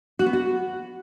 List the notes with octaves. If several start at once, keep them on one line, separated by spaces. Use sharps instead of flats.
F#4
B3
F#4